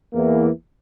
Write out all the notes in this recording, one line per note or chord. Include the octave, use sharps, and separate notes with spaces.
E2 E3 A#3